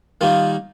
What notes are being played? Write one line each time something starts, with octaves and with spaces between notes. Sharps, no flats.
D#3 G3 A#3 D#4 F4